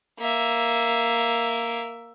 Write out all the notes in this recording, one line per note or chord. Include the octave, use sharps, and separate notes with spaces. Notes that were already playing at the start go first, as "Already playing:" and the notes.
A#3 E5